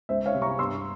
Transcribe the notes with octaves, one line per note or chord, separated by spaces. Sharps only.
C#2 C5 E5
C#5 F5
C3 G3
A#5 C#6
G2 C6 E6